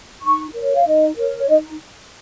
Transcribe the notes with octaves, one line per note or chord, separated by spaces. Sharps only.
D#4 C#6
A#4 C#5
F5
D#4 D#5
A#4 C#5
C#5
D#4 D#5